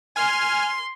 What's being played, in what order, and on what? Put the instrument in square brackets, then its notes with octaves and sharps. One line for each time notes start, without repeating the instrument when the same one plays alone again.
[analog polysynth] G#5 F6 [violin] C6